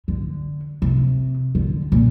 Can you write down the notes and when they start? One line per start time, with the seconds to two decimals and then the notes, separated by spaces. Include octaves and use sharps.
0.08 D3
0.82 C3
1.55 D3
1.92 A#2